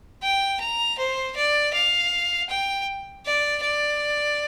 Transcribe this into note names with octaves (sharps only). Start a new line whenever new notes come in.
G5
A#5
C5
D5
F5
G5
D5
D5